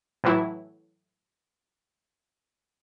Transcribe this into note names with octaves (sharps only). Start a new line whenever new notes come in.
A2 E3 F#3 E4